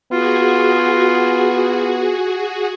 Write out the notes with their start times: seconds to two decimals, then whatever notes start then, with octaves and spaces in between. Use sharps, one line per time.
0.12 B3 F4 F#4 G#4